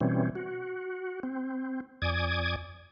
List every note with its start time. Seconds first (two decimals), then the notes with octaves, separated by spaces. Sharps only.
0.01 B2 E3 G3 C4 C#4
0.35 F#4
1.23 C4
2.02 F2 D5 G#5 D6 D#6 G#6